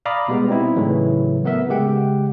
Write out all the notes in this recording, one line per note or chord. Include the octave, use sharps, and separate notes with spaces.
D5 F5 A#5 B5 D6 D#6
B2 G3 G#3 B3
C4 D#4 E4
A2 C#3 E3 F#3 A3
A3 B3 A#4 E5
C#3 G#3 G4 F#5 G5